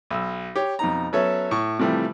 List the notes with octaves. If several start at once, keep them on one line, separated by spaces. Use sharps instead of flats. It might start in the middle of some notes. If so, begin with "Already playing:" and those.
B1 E6
G4 C#5
F2 B2 D#4 A#5
F#3 B3 C#4 A4 C#5 E5
A2 C#6
C3 E3 F3 G3 A3